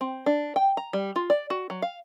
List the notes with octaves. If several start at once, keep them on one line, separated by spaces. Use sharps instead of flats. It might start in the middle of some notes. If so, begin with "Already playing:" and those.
C4
D4
G5
A#5
G3
F4
D5
F#4
F#3
F5